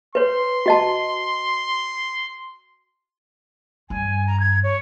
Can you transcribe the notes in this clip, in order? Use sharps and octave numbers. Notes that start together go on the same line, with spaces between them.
B4 C#5 C6
F#4 D#5 A5
G2 G#5
A#5
G#6
C#5